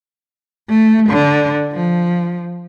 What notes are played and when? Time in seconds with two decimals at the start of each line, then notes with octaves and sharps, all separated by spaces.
0.69 A3
1.09 D3
1.73 F3